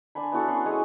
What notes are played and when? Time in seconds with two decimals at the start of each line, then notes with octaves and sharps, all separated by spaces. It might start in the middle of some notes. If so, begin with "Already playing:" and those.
0.15 D4 C5 G#5 B5
0.32 B3 E4 F#4 A4
0.48 C#4 C6
0.66 G#3 G#4 C#5 D#6